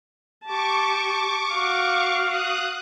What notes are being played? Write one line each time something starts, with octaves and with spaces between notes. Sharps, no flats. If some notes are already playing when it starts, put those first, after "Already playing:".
G4 A5 C#6 D6
F#4 F5
D#6 F#6